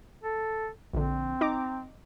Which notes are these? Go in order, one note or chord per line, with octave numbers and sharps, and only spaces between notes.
A4
A#1 D3 C4
D#4 A#5 D6